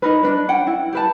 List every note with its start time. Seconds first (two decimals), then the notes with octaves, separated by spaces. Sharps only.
0.02 D#4 A#4 B4
0.23 D4 B4
0.48 C#4 F#5 G5
0.67 E4
0.93 G4 B4 A5